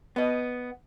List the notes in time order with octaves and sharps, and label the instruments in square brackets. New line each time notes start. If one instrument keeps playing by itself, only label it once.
[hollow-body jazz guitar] B3 D#5